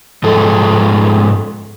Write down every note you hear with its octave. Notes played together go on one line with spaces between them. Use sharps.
G#2 F3 G#3 A4